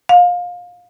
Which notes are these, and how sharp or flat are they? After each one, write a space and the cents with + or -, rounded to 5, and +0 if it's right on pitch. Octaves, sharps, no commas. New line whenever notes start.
F5 +25